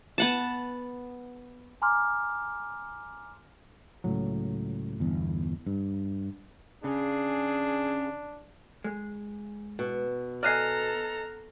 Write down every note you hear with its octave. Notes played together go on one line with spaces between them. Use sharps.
B3 F#5 A5
G#5 A#5 C6 D6 F6
C#2 A2 F#3
G1 E2
G2
C#3 D4 G#4
G#3
B2
A4 D5 D#5 G#5 A#5 F6 F#6 C7